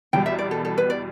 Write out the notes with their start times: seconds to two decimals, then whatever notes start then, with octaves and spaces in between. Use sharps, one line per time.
0.13 E2 B2 G3 G5
0.26 E5
0.39 D5
0.51 A4
0.65 A4
0.78 B4
0.90 D5